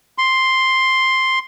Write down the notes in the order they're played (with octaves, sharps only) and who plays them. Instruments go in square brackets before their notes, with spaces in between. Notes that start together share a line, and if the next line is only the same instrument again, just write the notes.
[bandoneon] C6